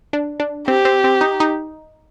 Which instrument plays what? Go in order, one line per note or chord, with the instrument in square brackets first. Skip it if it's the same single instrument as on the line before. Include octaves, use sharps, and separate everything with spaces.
[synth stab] D4
D4
[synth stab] C4 [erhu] G4
[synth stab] C4
C4
D#4
D#4